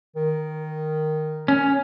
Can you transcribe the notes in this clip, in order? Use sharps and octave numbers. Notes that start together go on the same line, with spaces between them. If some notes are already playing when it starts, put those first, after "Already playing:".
D#3
C#4